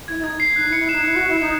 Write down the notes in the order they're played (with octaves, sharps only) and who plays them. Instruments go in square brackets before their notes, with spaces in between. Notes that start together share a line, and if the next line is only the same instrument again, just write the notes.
[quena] E4 [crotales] G#6
[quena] E4
[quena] D#4 [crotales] G#6
[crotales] C7
[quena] D#4 [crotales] F#6
[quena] E4
[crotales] C#7
[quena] E4
[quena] D#4 [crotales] E7
[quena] E4 [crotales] F#6
[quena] F#4
[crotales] F#6
[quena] E4
[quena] D#4 [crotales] C#7